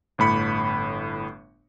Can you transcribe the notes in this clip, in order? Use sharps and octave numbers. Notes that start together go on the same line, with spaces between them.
G1 A2 B5 C#7